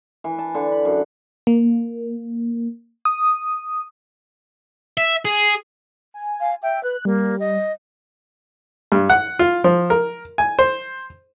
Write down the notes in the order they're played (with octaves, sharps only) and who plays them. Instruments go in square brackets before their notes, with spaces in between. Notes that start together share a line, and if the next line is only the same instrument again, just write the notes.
[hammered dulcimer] E3
A5
D3
B5
F#2
[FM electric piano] A#3
D#6
[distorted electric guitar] E5
G#4
[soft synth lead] G#5
[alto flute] F5
[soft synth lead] E5 [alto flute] G5
[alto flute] B4 [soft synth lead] F#6
[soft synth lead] G3 [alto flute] A#3
[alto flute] D#5
[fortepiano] G2
F#5
F4
F3
A#4
G#5
C5